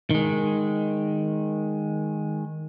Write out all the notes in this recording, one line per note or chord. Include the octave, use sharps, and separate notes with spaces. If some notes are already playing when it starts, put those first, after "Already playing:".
D#3 G#3